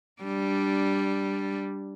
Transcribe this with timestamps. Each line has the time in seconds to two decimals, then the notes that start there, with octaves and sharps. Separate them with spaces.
0.22 G3 D4